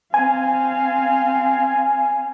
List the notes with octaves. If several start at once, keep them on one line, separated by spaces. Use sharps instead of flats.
C4 F5 G#5